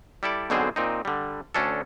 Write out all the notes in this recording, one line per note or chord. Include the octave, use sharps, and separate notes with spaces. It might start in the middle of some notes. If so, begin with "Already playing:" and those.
G3 E4 A4 D5
B1 B2 D3 C4 G#4 C5
A#2 C4 D#4
D3 G3
D2 C#4 D4 A4